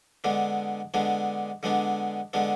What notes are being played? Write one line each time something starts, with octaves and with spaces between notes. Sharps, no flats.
D3 G#3 B3 D4
D3 G#3 B3 D4
D3 G#3 B3 D4
D3 G#3 B3 D4